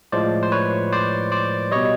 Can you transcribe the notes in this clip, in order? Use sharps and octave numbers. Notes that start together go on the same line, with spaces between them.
A2 F3 G#3 C5 D5
C5
B4 C#5
C5 D5
C5 D5
B2 G3 C#5 D#5